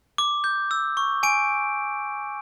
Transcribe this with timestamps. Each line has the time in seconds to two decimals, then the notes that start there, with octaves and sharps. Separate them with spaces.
0.18 D6
0.44 G6
0.71 E6
0.97 C#6
1.23 G#5 D7